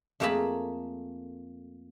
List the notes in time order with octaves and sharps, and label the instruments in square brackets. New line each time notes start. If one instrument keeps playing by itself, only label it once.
[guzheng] F2 A3 A#3 G#4 A5 B5